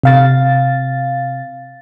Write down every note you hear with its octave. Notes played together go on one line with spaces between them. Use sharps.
C3 F5 A6